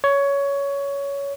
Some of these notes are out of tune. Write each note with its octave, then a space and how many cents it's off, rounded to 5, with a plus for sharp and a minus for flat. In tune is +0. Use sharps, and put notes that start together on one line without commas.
C#5 +15